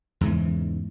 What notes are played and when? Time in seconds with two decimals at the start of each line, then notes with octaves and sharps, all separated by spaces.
0.21 E2 G#2 C#3 E3